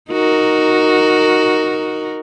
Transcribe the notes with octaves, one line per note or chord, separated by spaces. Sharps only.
D#4 F#4 A#4